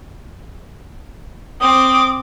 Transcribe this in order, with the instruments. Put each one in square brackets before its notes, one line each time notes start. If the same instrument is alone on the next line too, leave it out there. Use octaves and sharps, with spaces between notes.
[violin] C4 D6 [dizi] D#6